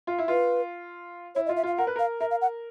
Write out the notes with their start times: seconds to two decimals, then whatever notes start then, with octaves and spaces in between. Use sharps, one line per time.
0.07 F4
0.18 E4
0.28 F4 B4
1.35 E4 C#5
1.46 D#5
1.49 F4
1.57 E5
1.63 F4 F5
1.77 A#4 F#5
1.87 B4
1.96 A#4 F5
2.21 A#4 E5
2.31 F5
2.41 F#5